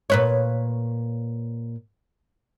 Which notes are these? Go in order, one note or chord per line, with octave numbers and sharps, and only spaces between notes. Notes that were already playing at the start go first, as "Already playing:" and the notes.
A#2 B4 C#5